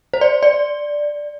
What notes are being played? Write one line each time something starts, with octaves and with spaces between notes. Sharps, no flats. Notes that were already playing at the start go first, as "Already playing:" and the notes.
C5
D5
D5